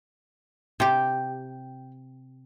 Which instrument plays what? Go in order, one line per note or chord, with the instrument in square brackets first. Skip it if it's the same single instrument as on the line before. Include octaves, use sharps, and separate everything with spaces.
[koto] C3 G4 [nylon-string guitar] G5